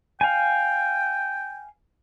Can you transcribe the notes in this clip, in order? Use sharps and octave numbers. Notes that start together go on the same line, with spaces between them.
F5 G5 G#5